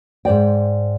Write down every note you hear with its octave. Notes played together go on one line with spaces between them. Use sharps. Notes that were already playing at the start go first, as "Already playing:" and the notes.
G#2 C5 D5 G5